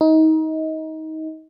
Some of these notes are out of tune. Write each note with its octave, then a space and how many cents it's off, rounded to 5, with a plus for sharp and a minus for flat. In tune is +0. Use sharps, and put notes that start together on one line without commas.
D#4 +25